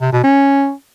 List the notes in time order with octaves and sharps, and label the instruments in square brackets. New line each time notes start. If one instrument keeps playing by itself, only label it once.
[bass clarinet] C3
B2
C#4